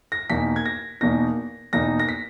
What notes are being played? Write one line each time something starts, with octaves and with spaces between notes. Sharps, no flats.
A#6
E2 B2 A#3 D#4 B6
G#6
A#6
E2 B2 A#3 D#4 A#6
E2 B2 A#3 D#4 A#6
A#6
B6